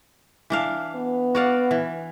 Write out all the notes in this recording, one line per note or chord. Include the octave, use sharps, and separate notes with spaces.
E3 D4 F5
B3
F#4 D5 F5
E3